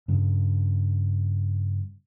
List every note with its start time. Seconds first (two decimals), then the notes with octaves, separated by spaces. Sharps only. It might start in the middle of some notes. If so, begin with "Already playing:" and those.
0.08 G2 C#3